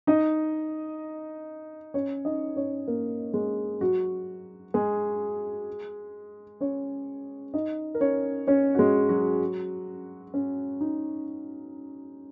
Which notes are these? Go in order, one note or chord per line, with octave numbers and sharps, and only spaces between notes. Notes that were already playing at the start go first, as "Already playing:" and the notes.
D#4 D#5
C#4 C#5
D#4 D#5
C#4 C#5
A#3 A#4
G#3 G#4
F#3 F#4
G#3 G#4
C#4 C#5
D#4 D#5
A#4
C#4 C#5
C#4 C#5
F#4
G#3 G#4
F#3 F#4
C#4
D#4